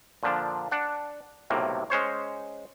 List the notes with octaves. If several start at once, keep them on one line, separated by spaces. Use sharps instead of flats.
A#2 D3 F3 D4
D4 F#5
B1 A2 C3 A#3
G#3 C#4 C5 C#5